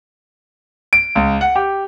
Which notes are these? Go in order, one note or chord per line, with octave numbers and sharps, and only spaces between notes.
D7
C#2
F#5
G4